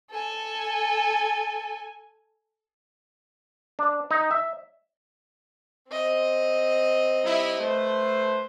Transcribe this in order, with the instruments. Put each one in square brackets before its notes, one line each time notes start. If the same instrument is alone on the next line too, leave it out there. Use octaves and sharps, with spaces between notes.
[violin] A4 G#5
[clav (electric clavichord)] D4
D#4
E5
[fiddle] C4 D#5
[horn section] G3 D#4 E4
A3 B4 C5